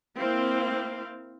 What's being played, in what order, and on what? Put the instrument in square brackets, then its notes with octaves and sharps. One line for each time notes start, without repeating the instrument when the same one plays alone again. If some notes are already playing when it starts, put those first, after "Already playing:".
[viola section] A#3 C4 E4 F5